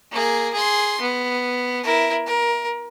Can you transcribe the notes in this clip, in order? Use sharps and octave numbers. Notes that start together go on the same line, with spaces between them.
A#3 G#4
G#4 C6
B3
E4 A#4
A#4